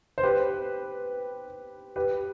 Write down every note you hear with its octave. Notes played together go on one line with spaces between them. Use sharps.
C5
G4 B4
G4 B4